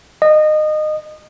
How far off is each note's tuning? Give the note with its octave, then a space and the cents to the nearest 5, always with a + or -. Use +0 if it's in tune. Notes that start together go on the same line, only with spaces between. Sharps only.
D#5 -25